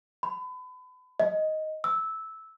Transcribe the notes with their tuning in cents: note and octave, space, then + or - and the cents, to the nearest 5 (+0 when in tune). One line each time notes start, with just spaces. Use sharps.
B5 +35
D#5 +5
E6 -10